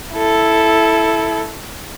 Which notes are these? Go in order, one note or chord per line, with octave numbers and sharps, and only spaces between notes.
E4 A4